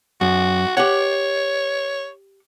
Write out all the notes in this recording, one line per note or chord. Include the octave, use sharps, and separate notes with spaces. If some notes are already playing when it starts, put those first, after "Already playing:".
F#2 F#4
G4 C#5 F#5